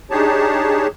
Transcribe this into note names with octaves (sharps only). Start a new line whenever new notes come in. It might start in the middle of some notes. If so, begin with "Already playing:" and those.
D4 D#4 G4 G#4 C#5 A5